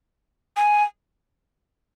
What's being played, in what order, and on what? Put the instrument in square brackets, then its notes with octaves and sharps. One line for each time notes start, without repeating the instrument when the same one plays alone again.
[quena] G#5